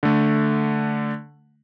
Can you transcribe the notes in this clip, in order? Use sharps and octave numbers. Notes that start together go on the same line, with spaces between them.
D3 A3